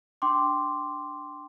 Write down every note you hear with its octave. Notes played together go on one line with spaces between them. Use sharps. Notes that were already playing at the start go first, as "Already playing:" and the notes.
D4 G5 C6 D6